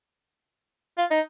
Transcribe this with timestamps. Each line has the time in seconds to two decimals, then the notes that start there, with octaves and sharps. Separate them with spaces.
0.98 F4
1.11 D#4